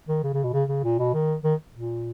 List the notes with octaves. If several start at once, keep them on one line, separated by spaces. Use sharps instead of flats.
D#3
C#3
C#3
B2
C#3
C#3
A#2
B2
D#3
D#3
A#2